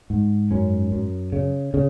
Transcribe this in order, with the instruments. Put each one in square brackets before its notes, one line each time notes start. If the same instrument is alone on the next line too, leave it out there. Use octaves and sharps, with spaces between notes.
[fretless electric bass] G#2
F#2 C#4
F#2
C#3
C#3